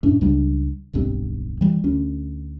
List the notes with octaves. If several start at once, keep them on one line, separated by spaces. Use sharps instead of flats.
F#2 A2 C#4 D4
C#2 C#3 G3 D4
D1 B1 G2 C4
E3 G3
D2 C#4